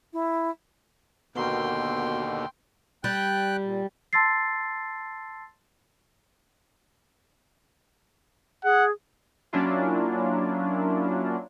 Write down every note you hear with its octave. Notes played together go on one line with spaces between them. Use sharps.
E4
D#2 B2 D3 B3 F#4 A#4 G5 C6
G3 G5 F#6
A#2
A5 C6 E6 A6 C7
G#4 F#5
F#3 A#3 C#4 D4 E4 F4